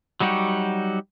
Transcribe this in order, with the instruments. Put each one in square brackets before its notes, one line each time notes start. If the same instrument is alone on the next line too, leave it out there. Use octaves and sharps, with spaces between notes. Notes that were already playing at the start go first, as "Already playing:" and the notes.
[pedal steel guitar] F#3 G3 D#4 F#4 G4